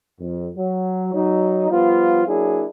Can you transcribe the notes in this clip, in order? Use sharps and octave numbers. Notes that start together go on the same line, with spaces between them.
F2
F#3
F#3 D#4
F3 G3 B3 F4
F#3 A#3 D4 E4 G#4